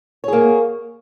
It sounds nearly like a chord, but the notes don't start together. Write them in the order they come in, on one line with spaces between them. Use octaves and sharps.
C#5 G#4 A#3